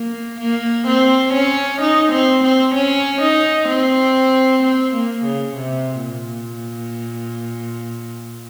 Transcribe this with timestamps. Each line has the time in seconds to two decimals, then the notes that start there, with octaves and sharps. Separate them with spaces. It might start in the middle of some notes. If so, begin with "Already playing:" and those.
Already playing: A#3
0.40 A#3
0.87 C4
1.33 C#4
1.81 D#4
2.11 C4
2.43 C4
2.74 C#4
3.21 D#4
3.68 C4
4.62 C4
4.93 A#3
5.24 C#3
5.56 C3
6.03 A#2